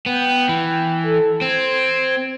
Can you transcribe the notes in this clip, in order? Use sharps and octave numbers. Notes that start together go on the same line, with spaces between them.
B3 G5
E3
A4
C4 G#6